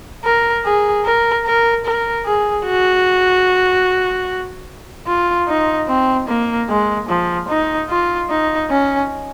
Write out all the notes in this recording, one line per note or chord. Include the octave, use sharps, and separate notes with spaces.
A#4
G#4
A#4
A#4
A#4
G#4
F#4
F4
D#4
C4
A#3
G#3
F3
D#4
F4
D#4
C#4